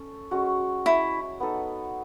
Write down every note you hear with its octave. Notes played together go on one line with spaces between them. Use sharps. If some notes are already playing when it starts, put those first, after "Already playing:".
Already playing: C#4 A4
G#3 C#4 F#4
E4
B3 D#4 A4